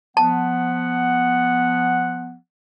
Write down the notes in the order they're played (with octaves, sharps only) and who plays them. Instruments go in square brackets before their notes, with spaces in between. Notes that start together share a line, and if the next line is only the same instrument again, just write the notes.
[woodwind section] F3 B3 [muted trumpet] F#5 [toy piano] A5